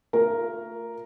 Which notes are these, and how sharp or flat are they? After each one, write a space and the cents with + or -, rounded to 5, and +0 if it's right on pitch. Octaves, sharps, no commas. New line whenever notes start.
A3 +40 F4 +10 A#4 +0